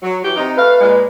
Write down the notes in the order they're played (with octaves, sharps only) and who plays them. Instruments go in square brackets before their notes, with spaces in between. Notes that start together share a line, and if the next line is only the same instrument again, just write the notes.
[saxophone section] F#3
E3 F#4 G4
C3 D#4
[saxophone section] A3 F5 [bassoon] B4
[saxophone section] A#2 G#3